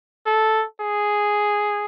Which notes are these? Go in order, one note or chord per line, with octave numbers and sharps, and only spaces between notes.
A4
G#4